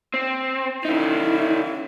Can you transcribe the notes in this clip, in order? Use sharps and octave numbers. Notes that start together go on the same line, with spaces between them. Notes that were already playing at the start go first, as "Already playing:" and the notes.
C4
C#3 D#4 E4